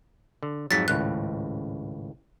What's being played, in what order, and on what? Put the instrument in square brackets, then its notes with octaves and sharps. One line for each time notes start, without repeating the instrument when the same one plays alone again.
[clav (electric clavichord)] D3
[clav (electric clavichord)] F2 G#2 F#3 [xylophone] A6 B6
[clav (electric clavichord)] G#1 C#2 A2 [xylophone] F#6